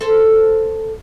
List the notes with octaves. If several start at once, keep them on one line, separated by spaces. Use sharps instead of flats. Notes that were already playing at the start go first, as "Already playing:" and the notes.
A4 C5